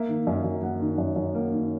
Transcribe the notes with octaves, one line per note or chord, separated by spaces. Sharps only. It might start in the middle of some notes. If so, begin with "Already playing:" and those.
Already playing: A#3 E5
D#3
F#2
F#2
A#3 F#5
D#3
F#2
F#2
A#3
D#3